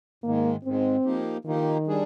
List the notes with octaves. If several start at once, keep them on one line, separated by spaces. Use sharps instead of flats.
G#2 D#3 G#3 A#3
G#2 D#3 G#3 C4
F3 A#3 D#4 G4
D#3 F3 A#3 D#4 G4
G3 D4 G#4